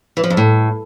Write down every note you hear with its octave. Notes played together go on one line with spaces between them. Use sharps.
E3
F3
F2
A2